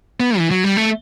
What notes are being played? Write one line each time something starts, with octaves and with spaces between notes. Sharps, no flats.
B3
E3
F#3
G3
A3